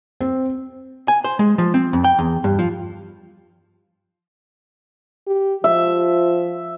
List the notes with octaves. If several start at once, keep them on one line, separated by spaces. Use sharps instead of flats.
C4
G#5
C5
G#3
F3
C4
F2
G5
E2
G2
F3
G4
F3 E5